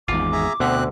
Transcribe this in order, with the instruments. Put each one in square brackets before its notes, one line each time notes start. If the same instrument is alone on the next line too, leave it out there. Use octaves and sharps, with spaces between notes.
[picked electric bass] G#1 E2 G#2 [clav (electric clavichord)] F4 [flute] D6
[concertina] G#4 E5 A#5
[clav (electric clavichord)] D2 D3 [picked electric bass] B2 [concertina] C4 F#6